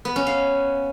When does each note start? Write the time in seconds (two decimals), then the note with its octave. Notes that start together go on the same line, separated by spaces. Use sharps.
0.05 B3
0.16 C#4
0.27 F5